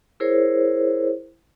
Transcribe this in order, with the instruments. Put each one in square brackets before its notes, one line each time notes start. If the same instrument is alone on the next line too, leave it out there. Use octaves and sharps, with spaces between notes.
[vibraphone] E4 G#4 A#4 C5 C#5